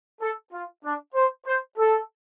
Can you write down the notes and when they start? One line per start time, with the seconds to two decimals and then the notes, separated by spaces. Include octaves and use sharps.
0.21 A4
0.52 F4
0.84 D4
1.15 C5
1.46 C5
1.77 A4